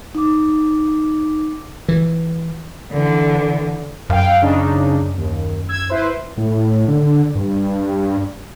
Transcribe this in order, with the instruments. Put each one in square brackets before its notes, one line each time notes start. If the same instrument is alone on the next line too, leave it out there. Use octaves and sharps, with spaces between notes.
[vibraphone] D#4 D6
[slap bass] E3
[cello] D3 E3
[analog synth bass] F#2 [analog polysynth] F5 G5
[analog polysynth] C#3 D4 D#4
D#2
E6 G#6
E4 B4 C5
[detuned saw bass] A2
D3
G2